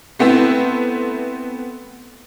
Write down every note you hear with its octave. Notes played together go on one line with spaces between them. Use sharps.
A3 B3 C4 E4